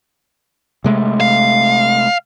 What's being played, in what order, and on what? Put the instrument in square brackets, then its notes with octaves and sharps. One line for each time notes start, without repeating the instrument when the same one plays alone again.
[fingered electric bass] C3 G#3 A3
[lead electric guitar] F5